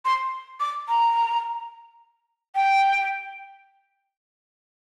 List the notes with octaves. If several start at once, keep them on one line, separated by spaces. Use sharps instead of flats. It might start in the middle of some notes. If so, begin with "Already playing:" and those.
C6
D6
A#5
G5